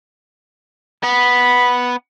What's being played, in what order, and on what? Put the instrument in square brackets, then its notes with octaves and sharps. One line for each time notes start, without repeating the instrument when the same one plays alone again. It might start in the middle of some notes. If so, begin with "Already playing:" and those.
[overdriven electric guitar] B3 [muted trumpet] B5